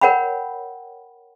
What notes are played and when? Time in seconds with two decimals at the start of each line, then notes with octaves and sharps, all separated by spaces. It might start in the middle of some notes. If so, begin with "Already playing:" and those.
0.01 A#4 C#5 F#5 G5 B5